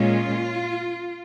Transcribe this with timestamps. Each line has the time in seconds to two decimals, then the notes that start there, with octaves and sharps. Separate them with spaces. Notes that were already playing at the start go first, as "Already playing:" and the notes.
Already playing: A#2 G#3 C#4 F4